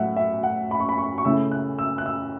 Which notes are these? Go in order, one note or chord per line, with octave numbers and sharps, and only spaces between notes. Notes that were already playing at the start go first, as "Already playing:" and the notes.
Already playing: A2 F#3 A3 E5 F#5
E5
F#5
B5
C#6
B5
C#6
C#6
C#3 A3 E4 E6
F#6
E6
F#6
E6